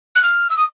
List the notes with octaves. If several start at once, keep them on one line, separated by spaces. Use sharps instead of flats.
F#6
F6
E6
D#6